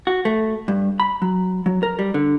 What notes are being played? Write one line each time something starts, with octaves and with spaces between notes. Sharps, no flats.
F#4
A3
G2
B5
F#3
F#3
A#4
G3
D3